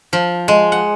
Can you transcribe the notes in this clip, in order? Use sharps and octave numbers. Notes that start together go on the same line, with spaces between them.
F3
G#3
F#5